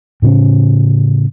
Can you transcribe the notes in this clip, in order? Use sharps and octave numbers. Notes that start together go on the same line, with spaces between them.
A2 C#3 C4 C#4